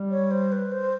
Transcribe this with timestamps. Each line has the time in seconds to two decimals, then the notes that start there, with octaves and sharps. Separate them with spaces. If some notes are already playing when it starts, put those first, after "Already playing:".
Already playing: G3
0.11 C#5
0.31 C5
0.52 B4
0.72 C5